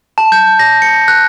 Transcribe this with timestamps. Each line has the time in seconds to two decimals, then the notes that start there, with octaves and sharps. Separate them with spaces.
0.18 A5
0.32 G6
0.59 A#6
0.82 C#7
1.08 F#6